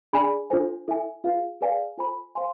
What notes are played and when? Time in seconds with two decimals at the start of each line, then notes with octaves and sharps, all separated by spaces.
0.13 D4 G#4 D5 G#5 B5
0.50 D4 F4 A4 C5 G#5
0.88 E4 A4 E5 G#5
1.24 F4 G#4 B4 F5
1.61 G#4 B4 D5 F5 G#5
1.98 F4 A4 C5 G#5 B5
2.35 C5 F5 G#5 C6